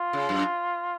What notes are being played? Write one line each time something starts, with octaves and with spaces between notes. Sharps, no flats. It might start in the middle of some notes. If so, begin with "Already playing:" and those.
Already playing: F4
C#3
F#2